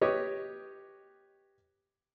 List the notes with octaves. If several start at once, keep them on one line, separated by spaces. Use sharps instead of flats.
G4 B4 C#5 D#5